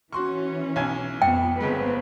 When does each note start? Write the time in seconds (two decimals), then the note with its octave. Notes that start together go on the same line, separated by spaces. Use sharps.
0.12 E3 C#4 F#4 C6 C#6
0.76 B1 G#5 G#6
1.22 F2 B3 G5
1.60 G1 G#3 B3 C4 B4